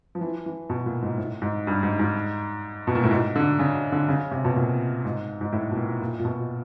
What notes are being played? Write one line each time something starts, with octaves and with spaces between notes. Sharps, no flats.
F3
E3
E3
B2
A#2
G#2
A2
G#2
G2
G#2
G#2
B2
A#2
A2
G#2
D3
C#3
D3
C#3
C3
B2
A#2
G#2
G#2
A2
B2
A#2
A#2
A#2
B2